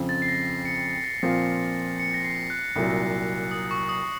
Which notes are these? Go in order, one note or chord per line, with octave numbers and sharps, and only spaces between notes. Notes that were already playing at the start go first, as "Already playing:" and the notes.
Already playing: F2 C#3 F3 C4
A6
C7
A#6
C#7
A#6
A#2 F3 C4 F4 C7
C#7
A#6
C7
F#6
C2 A#2 F#3
D#6
C#6
D#6